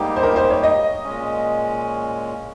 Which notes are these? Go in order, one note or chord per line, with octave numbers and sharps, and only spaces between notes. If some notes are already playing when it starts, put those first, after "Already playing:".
Already playing: G#2 G3 A#3 D#4 G4
C5
A#4
C5
C#5
D#5
A#2 G#3 C#4